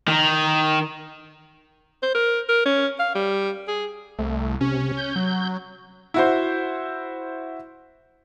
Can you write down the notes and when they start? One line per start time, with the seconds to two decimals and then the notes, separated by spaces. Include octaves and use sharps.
0.08 D#3
2.03 C5
2.14 A#4
2.49 A#4
2.65 C#4
2.99 F5
3.15 G3
3.67 G#4
4.19 C2 A3
4.61 C3 C#4
4.97 G6
5.16 F#3
6.14 E4 F#4 C5